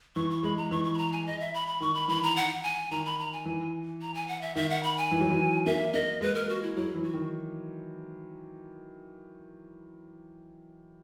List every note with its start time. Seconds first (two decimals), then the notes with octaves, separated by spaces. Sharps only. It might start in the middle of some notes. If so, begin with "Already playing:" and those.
0.16 E3 C#6
0.30 C#6
0.43 G#3 B5
0.57 A#5
0.71 E3 C#6
0.84 C#6
0.94 B5
0.98 A#5
1.12 G#5
1.26 D#5
1.40 E5
1.54 B5
1.68 B5
1.80 D#3 C#6
1.95 B5
2.08 E3 B5
2.23 A#5
2.36 F#5
2.63 G#5
2.91 D#3 A#5
3.05 B5
3.19 A#5
3.33 G#5
3.45 E3
4.02 A#5
4.14 G#5
4.28 F#5
4.42 E5
4.56 D#3 E5
4.70 F#5
4.83 B5
4.97 G#5
5.11 E3
5.20 F#3
5.30 E3
5.66 A#3 E5
5.93 A#3 D#5
6.21 G#3 B4
6.35 A#4
6.49 F#4
6.63 E4
6.76 F#3 E4
6.95 E3
7.03 F#4
7.13 D#3